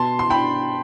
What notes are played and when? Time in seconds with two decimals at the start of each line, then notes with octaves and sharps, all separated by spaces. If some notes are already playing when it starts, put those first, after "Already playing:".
Already playing: B2 A5 C6
0.19 C6
0.30 D4 G5 B5